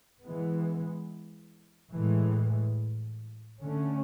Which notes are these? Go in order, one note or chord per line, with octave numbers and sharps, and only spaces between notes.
E3 G#3 B3
A2 E3 G#3
D3 A3 C#4